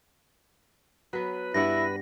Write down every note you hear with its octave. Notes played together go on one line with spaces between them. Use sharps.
F#3 B3 B4
G2 E4 D5 F#5 A#6